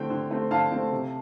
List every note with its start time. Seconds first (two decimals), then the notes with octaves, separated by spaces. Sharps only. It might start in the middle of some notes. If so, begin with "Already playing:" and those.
Already playing: D3 A3 C4 G5
0.10 D3
0.31 A3 C4
0.51 D3 F5 A5
0.72 A3 C4
0.92 C3